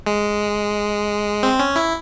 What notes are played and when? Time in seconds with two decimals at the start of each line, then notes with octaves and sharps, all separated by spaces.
0.06 G#3
1.43 C4
1.60 C#4
1.76 E4